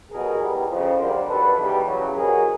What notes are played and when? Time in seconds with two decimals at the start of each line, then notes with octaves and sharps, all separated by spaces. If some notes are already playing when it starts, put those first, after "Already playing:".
0.11 C2 B2 F#3 G#4 A#4
0.40 E2 B2 G3
0.69 F2 C#3 F3
0.99 F2 D3 G3 A#4 C5
1.28 G2 D#3 F#3 A4 B4
1.58 E2 B2 G3
1.87 E2 C#3 F#3
2.16 C2 B2 F#3 G#4 A#4